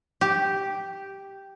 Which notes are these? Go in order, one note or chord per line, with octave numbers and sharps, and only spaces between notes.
G4